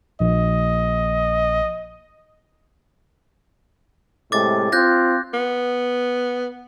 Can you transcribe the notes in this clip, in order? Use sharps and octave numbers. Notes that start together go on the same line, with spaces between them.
A#1 D#5
A2 C3 G#3 D6 A6
C4 F4 F#6 G6 A#6
B3